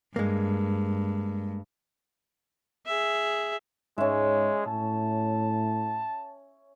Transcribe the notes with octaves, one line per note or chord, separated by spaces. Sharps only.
G2 G#3 A#3
G#4 E5
G#2 G#3 C#4 E5
A2 A5